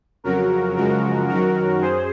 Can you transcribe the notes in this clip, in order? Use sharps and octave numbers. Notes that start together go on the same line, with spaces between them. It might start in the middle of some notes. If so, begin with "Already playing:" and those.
F2 C#3 F#3 F#4 A#4
F#2 C#3 F3 G#3 F#4 A#4
F#2 D#3 F#3 F#4 A#4
F#2 G#4 C5